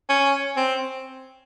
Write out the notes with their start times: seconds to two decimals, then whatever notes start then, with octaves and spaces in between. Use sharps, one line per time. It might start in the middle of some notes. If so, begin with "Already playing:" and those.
0.10 C#4
0.56 C4